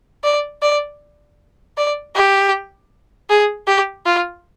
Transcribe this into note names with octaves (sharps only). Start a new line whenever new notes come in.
D5
D5
D5
G4
G#4
G4
F4